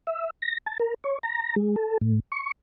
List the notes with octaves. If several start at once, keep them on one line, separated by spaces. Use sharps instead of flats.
E5
A#6
A5
A#4
C#5
A#5
G#3
A4
A2
C#6